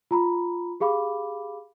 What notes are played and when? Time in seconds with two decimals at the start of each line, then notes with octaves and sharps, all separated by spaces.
0.11 F4 A#5 B5
0.80 G4 G#4 F5 B5 D6